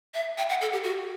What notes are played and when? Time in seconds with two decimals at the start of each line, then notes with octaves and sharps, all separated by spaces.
0.14 E5
0.38 G5
0.49 F#5
0.61 A4
0.73 G4
0.84 F#4